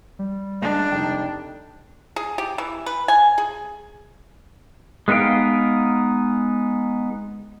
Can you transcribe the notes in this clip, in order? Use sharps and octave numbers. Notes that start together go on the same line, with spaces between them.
G3
C#2 D4
F1 D#4 G5
G#4
G4
E3
B4
G#5
G#4
G#3 B3 D#4 F5 G5